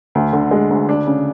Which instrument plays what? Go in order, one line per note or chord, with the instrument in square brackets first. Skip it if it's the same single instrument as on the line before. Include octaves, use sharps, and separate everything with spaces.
[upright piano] D2
D3
G#3
D2
D4
C#3